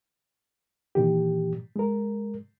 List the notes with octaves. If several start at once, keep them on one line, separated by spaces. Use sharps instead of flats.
A#2 D#3 E3 G4
G#3 A#4